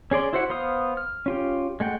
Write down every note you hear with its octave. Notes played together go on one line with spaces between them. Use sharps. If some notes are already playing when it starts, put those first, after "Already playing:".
C#4 G#4 D5 C6
E4 F#4 C5 E5 F#5
B3 C5 F5 D#6
F6
C#4 F4 G4
G#3 A3 F#5 G5